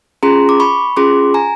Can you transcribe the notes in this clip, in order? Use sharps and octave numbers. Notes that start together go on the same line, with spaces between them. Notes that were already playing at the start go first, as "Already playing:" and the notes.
C#4 F4 G#4 A#5 C6
D6
B5 C#6
C#4 F4 G#4 C6 D6
G#5 A#5